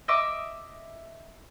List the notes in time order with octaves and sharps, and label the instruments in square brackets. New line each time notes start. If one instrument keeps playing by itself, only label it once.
[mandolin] D#5 E5 D6 D#6